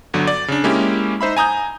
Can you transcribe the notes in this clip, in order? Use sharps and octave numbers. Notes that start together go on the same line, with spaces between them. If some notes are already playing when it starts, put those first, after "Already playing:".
G1 D3 F#3
D5
C#3 D4
G#3 A#3 C#4 E4 G4
D#4 C5 E5 B5
G#5 A#5 D#6 G6